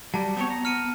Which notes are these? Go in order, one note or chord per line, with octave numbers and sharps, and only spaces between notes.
F#3 G3 A5
B3 C4 C#5
A#5
B3 F6 C#7 D#7